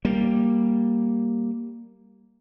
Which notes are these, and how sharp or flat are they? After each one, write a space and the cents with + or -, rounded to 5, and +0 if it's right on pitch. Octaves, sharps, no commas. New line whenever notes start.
G3 +0 A#3 +0